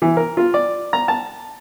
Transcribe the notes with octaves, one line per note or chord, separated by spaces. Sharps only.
E3
A#4
F4
D5
A#5
A5